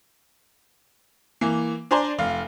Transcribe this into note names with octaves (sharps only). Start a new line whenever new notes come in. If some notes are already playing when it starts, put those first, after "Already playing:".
E3 A#3
D4 C5 D5 G#5 A#5 C6
F1 F5